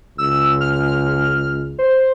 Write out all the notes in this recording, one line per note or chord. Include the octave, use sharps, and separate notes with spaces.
C#2 E6
F6
C5